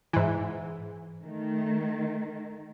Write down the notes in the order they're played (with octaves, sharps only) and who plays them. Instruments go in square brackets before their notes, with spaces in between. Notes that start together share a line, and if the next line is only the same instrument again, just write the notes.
[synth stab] G#2 E3
[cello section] D#3 A3